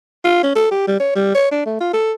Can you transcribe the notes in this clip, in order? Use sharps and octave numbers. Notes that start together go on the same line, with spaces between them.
F4
C#4
A4
G4
G3
C#5
G3
C#5
D4
A3
F4
A4